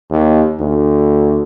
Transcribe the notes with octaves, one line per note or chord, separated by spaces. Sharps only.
D#2
D2